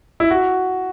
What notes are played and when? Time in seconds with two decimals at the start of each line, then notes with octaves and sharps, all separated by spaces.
0.20 E4
0.31 F#4